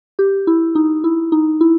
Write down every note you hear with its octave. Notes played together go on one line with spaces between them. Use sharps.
G4
E4
D#4
E4
D#4
E4